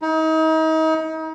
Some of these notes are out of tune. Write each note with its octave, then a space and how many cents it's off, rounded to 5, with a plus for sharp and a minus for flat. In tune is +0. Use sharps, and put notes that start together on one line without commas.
D#4 +35